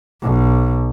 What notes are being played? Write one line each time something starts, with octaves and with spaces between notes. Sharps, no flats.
B1